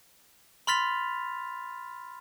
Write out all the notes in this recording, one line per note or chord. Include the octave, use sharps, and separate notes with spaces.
B5 C6 F6 A6 B6 F7